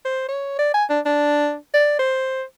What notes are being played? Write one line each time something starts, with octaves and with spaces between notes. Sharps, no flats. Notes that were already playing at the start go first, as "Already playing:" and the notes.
C5
C#5
D5
G#5
D4
D4
D5
C5